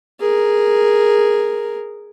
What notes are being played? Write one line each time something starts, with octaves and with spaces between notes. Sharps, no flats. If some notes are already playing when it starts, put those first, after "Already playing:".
G#4 A#4